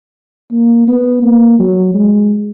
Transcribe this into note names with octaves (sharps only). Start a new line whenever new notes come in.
A#3
B3
A#3
F#3
G#3